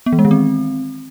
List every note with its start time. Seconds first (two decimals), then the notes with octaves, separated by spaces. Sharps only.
0.06 B3
0.13 E3
0.19 G#3
0.25 D#3
0.31 C4